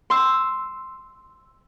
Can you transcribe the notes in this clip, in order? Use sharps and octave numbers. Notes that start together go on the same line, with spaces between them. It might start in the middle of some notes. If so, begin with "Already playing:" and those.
C6 E6